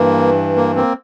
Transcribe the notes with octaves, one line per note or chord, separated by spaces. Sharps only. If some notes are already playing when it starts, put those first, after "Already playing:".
Already playing: G2 E3 A#3
A#3
A#3 C4